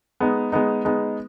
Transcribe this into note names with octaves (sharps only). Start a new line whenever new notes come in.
G#3 B3 D#4
G#3 B3 D#4
G#3 B3 D#4